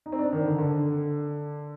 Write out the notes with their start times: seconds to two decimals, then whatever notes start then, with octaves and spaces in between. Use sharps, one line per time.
0.06 D#4
0.12 C4
0.19 D4
0.32 D#3
0.45 D3
0.58 D3